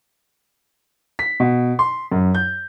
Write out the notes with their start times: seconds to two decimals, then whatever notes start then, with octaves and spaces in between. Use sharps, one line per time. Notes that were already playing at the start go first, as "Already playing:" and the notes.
1.19 B6
1.40 B2
1.79 C6
2.12 F#2
2.35 G6